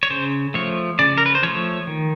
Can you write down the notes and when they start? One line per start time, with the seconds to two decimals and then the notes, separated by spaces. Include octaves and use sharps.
0.03 C#5
0.10 C#3 C5
0.54 F3 A3 C#5
0.99 C#3 D5
1.18 A#4
1.26 B4
1.35 C5
1.43 F3 A3 C#5
1.87 D#3